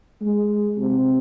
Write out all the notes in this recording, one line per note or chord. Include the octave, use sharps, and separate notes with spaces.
G#3
C3